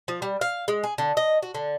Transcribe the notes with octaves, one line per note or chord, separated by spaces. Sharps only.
F3
G3
F5
G#3
G#4
D3
D#5
F#4
D3